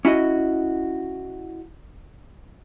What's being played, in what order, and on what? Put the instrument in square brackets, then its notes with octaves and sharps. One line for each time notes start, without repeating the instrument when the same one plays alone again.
[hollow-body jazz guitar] C#4 E4 F#4 D#5